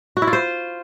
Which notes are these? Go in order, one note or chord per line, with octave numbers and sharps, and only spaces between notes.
F#4
E4
F4
C5